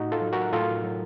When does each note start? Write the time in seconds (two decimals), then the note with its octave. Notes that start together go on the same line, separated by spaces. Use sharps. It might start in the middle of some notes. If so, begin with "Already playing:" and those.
Already playing: A2 D#4 F#4
0.12 F4 A4
0.22 F#3
0.33 F#4 A#4
0.53 A2 F4 A4
0.84 F#3